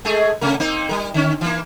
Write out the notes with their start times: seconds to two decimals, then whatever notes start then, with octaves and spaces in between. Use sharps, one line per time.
0.05 G#3 A3 G#4
0.41 C3 A3 A#4
0.60 A#3 C4 D#4
0.89 G3 A#4
1.14 D3 C#4
1.41 E3 A#3